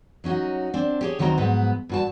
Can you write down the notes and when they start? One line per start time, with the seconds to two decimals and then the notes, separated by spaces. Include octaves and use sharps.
0.24 F#3 C#4 D#4 F#4
0.74 C4 D4
1.01 G4 G#4 C#5
1.19 D2 D#3 F#3 C4 D#5 A#5
1.37 G#2 F3 F#3 B3 B4
1.89 G2 F#4 A5